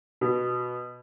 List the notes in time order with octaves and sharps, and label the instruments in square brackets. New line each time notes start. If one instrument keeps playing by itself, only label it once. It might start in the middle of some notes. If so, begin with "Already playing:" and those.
[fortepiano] B2